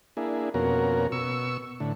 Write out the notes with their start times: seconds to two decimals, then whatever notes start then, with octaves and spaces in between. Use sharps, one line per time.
0.17 A#3 D4 E4 G#4
0.54 F2 B2 A#3 C#4 F#4 A#4
1.12 B2 C#6 E6
1.80 A2 D3